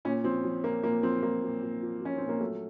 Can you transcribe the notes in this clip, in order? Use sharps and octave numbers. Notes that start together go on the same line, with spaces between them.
A#2 C#4
F3 C4
F3
A#2 A#3
A#2 A#3
F3 C4
F3 A#3
A#2
A#2
F3
F3 C#4
A#2 C4
A#3
F#3 A3